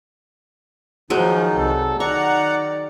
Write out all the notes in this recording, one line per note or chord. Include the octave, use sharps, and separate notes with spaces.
D#3 F3 F#3 G#3 D#4
C2 A4
D#3 D5 F#5 A#5 C#6